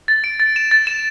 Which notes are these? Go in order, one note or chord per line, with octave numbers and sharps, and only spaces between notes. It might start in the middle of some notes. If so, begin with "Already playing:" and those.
A6
D7
A6
E7
A6
E7